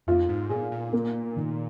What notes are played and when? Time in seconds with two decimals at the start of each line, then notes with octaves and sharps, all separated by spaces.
0.07 F2 F4
0.29 G#2
0.50 A#2 G#4
0.72 A#2
0.93 A#3
1.36 D#3